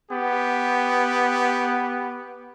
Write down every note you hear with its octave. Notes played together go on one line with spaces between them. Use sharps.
B3 G4